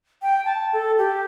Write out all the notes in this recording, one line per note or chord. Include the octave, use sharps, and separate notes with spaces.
G5
A5
A4
G4